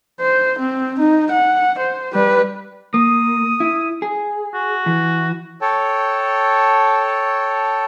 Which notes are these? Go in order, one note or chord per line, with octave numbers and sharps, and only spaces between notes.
C5
C4
D#4
F#5
C5
G3 B4
A#3 D#6
E4
G#4
F#4
E3
A4 C#5 G5 A5